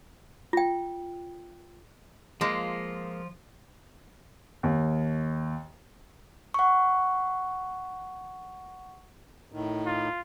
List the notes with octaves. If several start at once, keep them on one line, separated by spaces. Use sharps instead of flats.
F4 G5
F3 G#3 A#3 F4
D#2
F#5 C#6
A2 D#3
F4